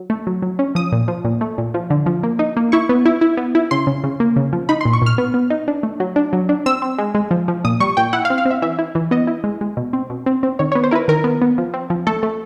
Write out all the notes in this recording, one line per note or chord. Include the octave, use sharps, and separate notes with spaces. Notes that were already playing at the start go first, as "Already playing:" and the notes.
Already playing: F#3
A3
F#3
F#3
C#4
F3 D#6
A#2
F3
A#2
A3
A#2
F3
D3
F3
A#3
D#4
A#3
E4 C#6
B3
E4
E4
B3
E4
C#3 C6
C#3
C#3
A#3
C#3
F3
D#4 B5
C6
A#2
C#6
A#2 F6
B3
B3
D#4
D4
A3
F#3
D4
F#3
D4
C4 E6
C4
G#3
G#3
F3
F3
A#2 D#6
G3 C#6
A#2 G5
E4 F#5
F5
C4
F5
C4
E5
E3 E5
E4
E3
B3 D#5
E4
G#3
G#3
B2
C4
B2
C4
C4
D#3 C#5
C#5
B3
C5
E4 A#4 B4
D#3 A#4
B3
B3
F3
C4
F3
A3 A4
A3